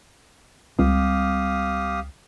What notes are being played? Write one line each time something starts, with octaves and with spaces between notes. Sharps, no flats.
C#2 G3 C4 G4 F5 D#6